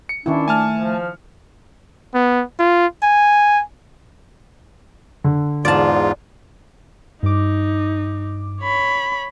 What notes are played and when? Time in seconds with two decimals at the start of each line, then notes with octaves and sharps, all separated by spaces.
0.09 C#7
0.26 D#3 C#4 D4 E4
0.48 A3 G#5 A5 F6
0.77 F3
2.15 B3
2.59 F4
3.03 G#5
5.24 D3
5.65 E2 G#2 F4 D5 A5
7.23 G2 D#4 D6
8.62 C#5 B5